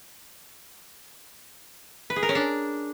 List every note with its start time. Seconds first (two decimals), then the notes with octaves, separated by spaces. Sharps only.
2.10 B4
2.16 G#4
2.23 A#4
2.29 C#4
2.35 D4